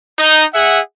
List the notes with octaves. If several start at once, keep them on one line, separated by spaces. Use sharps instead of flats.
D#4
G#4 E5 F#5